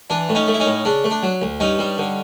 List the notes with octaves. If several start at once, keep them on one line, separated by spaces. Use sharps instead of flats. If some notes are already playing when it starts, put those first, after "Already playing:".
E3 D4
A2
C#4 D#4
A3
E4
C#4 D#4
A2
C#3 D4
A3
D4
F#3
D2
G2 C#4 D#4
G3
D3